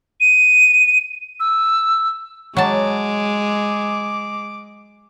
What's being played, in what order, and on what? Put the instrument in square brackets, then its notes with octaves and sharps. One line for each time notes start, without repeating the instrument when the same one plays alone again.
[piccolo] D#7
E6
[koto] F#3 A5 [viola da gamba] G#3 [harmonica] D6